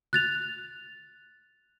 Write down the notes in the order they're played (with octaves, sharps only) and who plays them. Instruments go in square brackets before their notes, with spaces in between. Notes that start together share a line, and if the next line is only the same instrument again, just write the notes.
[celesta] F#6 A6 F7